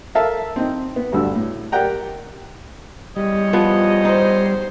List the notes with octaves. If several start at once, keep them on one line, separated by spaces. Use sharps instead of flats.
A4 A#4 E5 F5 A5
C4 D#4
B3
D2 G2 D3 F#4 A4 E6
A2
G4 A#4 D5 F#5 G5 A#5
E2 G3 C#5 D#5
F3 B3
D#4 C5